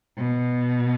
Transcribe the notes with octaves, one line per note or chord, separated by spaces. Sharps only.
B2